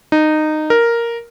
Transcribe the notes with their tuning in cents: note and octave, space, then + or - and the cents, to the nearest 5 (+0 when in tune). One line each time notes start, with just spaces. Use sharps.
D#4 -15
A#4 +0